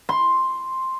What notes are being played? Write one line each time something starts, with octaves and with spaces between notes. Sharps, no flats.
C6